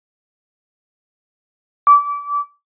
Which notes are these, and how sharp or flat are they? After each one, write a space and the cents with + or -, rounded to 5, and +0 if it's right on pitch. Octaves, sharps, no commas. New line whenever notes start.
D6 -25